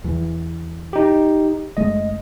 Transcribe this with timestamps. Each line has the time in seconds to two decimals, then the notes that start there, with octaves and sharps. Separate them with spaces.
0.04 E2 E3
0.93 D#4 G4
1.77 F#1 G#3 A3 D#5